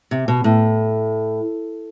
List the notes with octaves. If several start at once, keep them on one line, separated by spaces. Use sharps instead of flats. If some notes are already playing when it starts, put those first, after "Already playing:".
C3
B2
A2